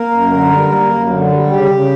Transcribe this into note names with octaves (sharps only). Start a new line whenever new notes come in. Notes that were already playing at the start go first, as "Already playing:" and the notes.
Already playing: A#3 A#4
F#2
D3
G3
A#3
F#2
D3
G3
C#3 G4
C#3